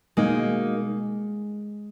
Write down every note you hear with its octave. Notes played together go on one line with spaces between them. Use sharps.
B2 G#3 A#3 D#4